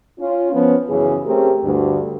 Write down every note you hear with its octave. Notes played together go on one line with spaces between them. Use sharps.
C#4 F4
F3 B3 C#4
F#2 C#3 E3 G#4
A3 C4 C#4 G4 G#4 A#4
D2 G2